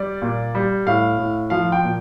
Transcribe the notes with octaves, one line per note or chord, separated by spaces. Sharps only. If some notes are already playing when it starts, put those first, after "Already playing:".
Already playing: G3 D5
A#2
G3
A2 F5
A2
F3 F5
G5
A#2